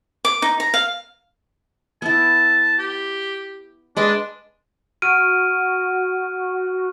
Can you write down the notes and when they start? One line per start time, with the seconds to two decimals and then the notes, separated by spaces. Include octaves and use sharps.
0.25 D6
0.42 D#4
0.60 A#5
0.74 F5
2.02 B3 E4 A5
2.78 G4
3.97 G#3 D4 B4 D#5
5.02 F#4 F6 D7 D#7